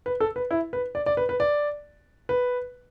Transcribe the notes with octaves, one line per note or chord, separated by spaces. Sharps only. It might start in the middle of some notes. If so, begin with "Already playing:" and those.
B4
A4
B4
E4
B4
D5
D5
B4
B4
D5
B4